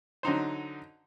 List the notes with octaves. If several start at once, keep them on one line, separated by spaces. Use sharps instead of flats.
D3 F#3 D#4 C5